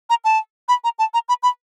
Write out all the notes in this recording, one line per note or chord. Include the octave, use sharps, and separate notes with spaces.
A#5
A5
B5
A#5
A5
A#5
B5
B5